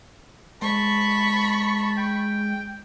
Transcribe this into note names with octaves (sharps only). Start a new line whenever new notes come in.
G#3 A5 B5 C#6
G5